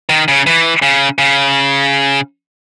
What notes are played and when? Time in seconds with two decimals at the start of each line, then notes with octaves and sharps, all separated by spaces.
0.09 D#3
0.28 C#3
0.47 E3
0.82 C#3
1.18 C#3